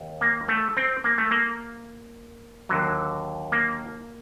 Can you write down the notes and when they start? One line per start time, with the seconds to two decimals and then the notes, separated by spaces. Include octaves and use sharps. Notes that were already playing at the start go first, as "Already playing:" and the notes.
Already playing: D#2
0.21 A#3
0.48 A3
0.77 C4
1.04 A#3
1.18 A3
1.31 A#3
2.69 D#2 D3 F#3
3.52 A#3